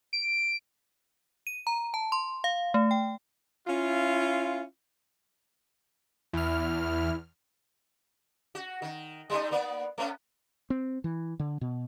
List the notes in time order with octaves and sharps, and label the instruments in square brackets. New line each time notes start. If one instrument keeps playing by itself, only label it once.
[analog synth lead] D7
[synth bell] D#7
A#5
A5
C6
F5
A3
G5
[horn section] C#4 E4 F4
[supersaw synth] E2 F6 [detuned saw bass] E4
[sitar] F#4
D#3
G3 A3 D#4
A#3 B3 D5
A3 B3 C#4
[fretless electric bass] C4
E3
D3
B2